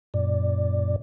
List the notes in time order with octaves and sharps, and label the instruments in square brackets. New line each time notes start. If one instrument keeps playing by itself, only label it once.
[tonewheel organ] F#2 A#2 D5